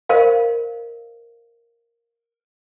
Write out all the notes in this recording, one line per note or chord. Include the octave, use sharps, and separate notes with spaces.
A#4 C5 D#5 F5